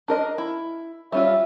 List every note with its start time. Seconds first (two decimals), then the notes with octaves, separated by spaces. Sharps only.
0.08 D4 A#4 D#5
0.38 E4
1.12 G3 C#4 F4 E5